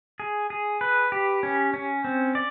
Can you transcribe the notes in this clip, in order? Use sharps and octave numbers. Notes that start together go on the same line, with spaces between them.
G#4
G#4
B4
G4
C#4
C#4
C4
D5